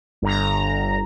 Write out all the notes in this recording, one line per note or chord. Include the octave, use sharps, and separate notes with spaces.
G1 A#5